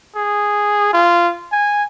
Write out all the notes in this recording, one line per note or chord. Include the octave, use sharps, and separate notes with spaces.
G#4
F4
G#5